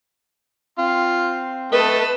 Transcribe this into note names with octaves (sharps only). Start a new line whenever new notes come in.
C4 F4
A3 B4 D#5 A5